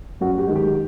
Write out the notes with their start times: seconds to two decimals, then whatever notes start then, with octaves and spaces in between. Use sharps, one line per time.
0.21 F#2 F#4
0.38 G4
0.47 D#3 G#3
0.56 G4